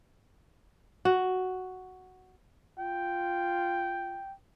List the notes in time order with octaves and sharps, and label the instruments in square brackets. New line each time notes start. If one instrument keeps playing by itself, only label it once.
[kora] F#4
[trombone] F4 [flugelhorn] G5